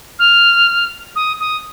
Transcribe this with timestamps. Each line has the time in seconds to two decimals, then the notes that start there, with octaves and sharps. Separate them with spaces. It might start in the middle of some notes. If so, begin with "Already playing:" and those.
0.19 F6
1.15 D#6
1.40 D#6